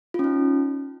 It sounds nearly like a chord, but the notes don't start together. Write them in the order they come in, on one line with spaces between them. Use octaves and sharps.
F4 C#4 D#4